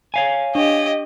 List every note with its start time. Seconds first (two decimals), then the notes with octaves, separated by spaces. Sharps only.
0.14 C#5 F5 G#5
0.55 D4 G4 D#5